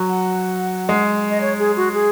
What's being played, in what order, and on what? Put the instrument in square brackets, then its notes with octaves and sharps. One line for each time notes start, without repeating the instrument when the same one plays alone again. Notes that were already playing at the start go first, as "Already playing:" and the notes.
Already playing: [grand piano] F#3
[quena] F#5
[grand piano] G#3
[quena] D#5
C#5
G#4
F#4
G#4